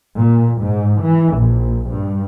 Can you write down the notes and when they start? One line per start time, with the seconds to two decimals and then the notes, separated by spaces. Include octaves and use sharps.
0.14 A#2
0.62 G#2
1.02 E3
1.35 A#1
1.90 G2